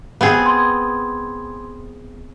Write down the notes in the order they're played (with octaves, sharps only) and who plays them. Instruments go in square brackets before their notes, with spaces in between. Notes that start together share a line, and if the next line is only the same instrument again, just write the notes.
[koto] B3 C4 G#4
[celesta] C6 G#6